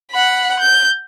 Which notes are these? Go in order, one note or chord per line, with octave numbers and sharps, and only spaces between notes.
F#5 B5
G6